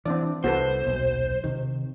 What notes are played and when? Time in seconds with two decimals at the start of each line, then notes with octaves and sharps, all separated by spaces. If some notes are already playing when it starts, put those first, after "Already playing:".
0.06 E3 C4 D4 D5
0.44 C2 B3 F#4 A4 B4 C5
0.86 D#1 B1
1.44 C3 D#3